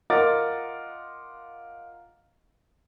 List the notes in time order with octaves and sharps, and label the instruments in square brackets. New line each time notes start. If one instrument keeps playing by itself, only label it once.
[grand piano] F4 A#4 D#5 F#5 D6 A6